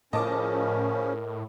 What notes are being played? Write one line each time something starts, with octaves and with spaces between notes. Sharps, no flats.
A2 C#3 F3 C#4 A#4 D#5 A5 D6